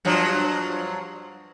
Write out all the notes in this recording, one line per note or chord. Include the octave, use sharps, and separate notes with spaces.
G2 F3 F#3